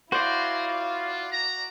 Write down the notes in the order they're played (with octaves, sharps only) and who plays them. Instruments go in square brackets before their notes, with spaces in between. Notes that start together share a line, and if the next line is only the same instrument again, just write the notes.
[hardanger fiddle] E4 F5 [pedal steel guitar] F#4 D5 [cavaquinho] C5 [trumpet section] G#5 A#5 C6
[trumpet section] F4
A#5